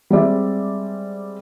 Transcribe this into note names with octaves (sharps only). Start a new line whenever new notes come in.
G3 G#3 C4 G4 D5 E5